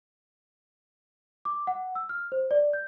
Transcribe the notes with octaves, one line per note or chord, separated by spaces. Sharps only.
D6
F#5
E6
F6
C5
D5
G6